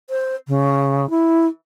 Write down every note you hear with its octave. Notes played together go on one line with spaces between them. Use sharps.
C5
C#3
E4